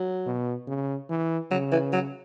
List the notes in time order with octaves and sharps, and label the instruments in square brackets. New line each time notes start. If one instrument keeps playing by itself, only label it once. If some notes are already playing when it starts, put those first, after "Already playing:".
Already playing: [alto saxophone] F#3
[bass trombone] B2
C#3
E3
[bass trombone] C#3 [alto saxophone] F#3
[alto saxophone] E3
F#3